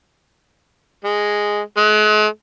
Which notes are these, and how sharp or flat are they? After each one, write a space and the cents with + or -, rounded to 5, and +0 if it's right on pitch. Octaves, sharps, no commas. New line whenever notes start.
G#3 -5
G#3 +40